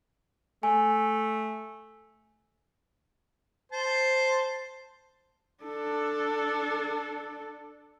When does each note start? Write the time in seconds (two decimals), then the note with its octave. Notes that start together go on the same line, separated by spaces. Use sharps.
0.63 A3 G#5
3.72 C5 A5 C6
5.64 D4 A4